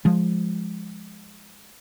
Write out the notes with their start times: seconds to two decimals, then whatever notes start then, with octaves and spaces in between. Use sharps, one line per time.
0.05 F3 G#3